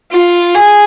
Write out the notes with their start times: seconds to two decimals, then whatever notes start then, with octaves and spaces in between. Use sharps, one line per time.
0.12 F4
0.55 G#4